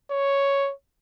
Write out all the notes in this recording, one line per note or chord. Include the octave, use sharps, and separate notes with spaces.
C#5